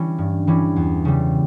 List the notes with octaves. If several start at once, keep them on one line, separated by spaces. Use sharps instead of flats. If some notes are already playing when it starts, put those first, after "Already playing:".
Already playing: E3 G3 C#4
G2
E3 G3 C#4
E2
C#3 G3